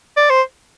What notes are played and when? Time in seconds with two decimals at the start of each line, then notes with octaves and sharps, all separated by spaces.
0.17 D5
0.30 C5